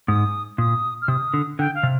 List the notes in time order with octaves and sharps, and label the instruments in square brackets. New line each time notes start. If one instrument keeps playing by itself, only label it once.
[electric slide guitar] G#2 [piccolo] D#6
[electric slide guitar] A#2 [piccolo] D#6
[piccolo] F6
[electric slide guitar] C3 [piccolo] D#6
[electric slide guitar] D3
[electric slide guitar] D3 [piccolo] G5
[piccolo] F5
[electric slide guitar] C3